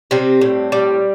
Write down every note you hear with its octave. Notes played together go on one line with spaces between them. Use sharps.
C3 G3 C4
A2
G3